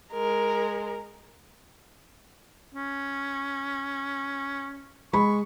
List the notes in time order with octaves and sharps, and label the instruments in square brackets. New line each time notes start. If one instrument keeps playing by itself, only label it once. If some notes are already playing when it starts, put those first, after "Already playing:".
[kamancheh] G#3 A#4
[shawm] C#4
[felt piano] G#3 B5 [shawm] C#6